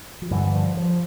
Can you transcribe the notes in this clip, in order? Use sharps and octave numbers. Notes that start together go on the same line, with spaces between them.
F3
G2 D3 E3
F3
F3